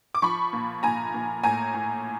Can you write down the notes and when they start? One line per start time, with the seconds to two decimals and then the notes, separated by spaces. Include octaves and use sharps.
0.15 D6
0.22 F3 B5 C#6
0.53 A#2
0.83 A#2 G#5 A#5
1.14 A#2
1.43 A2 G#5 A#5
1.74 A2